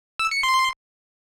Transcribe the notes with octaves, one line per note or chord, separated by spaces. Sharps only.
E6
C#7
C6